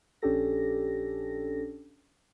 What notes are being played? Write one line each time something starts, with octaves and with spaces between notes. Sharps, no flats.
A#1 C#4 D4 G4 A4 A#6